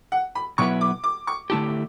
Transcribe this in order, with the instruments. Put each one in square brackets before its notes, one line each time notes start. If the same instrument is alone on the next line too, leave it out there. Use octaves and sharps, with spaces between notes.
[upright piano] F#5
B5
[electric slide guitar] B2 F#3 B3 E4 B4 [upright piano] C#6
[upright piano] D6
D6
C#6
[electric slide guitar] D3 A3 E4 G4 [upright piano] A5